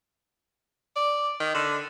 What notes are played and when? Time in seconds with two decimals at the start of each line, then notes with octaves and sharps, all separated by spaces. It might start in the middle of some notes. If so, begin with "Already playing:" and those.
0.96 D5
1.40 D#3
1.55 D3